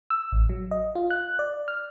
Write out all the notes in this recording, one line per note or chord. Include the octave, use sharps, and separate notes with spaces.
E6
A1
F#3
D#5
F4
F#6
D5
F6